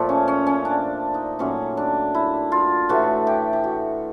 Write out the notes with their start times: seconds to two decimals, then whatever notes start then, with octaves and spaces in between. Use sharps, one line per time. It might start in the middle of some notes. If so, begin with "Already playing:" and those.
Already playing: A#2 F3 A3
0.09 C#4
0.28 C#4
0.46 C#4
0.65 D4
1.14 D#4
1.39 A#2 F#3 A3 C#4
1.77 D4
2.15 E4
2.52 F4
2.89 A2 E3 A3 F#4
3.27 G4
3.53 G4
3.64 F#4